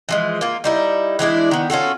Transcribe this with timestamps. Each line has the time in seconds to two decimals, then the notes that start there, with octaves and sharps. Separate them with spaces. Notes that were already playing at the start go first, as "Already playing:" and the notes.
0.09 E3 F3 G#3
0.41 A#3 F4
0.64 G3 D#4 E4
1.19 E3 G#3 D4 E4
1.51 D#3 B3
1.70 C#4 F4 F#4 A4